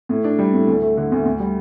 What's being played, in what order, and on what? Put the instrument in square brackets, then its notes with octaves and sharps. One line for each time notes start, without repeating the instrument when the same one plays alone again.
[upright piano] A2
D4
G3
A2
D2
A3
D3
D2
D2
G3